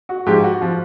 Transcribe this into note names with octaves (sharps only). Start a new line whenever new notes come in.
F#4
G#2 F3 G4
F#4
F3 F4